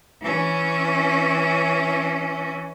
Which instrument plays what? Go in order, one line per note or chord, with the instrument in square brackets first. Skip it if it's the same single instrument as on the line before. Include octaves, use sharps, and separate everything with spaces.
[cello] E3 C#4